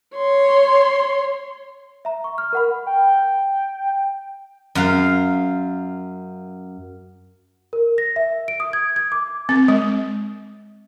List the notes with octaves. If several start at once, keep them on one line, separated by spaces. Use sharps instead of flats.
C#5 C6
E5 A#5
C#6
F6
A#4 F#5 B5
G5
F#2 F5
A#4
A#6
E5
D7
D#6
G#6
G#6
D6
C4
G#3